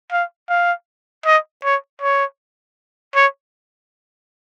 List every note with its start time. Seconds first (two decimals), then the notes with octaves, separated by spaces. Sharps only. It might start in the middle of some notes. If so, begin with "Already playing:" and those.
0.12 F5
0.49 F5
1.25 D#5
1.64 C#5
2.02 C#5
3.15 C#5